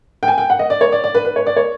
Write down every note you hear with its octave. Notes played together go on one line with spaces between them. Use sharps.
G5
G#5
G5
F#5
D#5
D5
C#5
D5
D5
B4
B4
C#5
D5
C#5